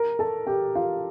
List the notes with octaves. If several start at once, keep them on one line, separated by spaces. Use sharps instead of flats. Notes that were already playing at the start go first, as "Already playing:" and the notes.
Already playing: A#4 A#5
A4 A5
G4 G5
F4 F5